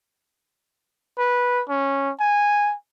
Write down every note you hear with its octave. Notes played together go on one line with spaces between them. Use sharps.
B4
C#4
G#5